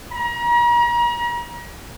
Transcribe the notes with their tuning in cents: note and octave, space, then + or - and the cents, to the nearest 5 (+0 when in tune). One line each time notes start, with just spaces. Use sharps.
A#5 +40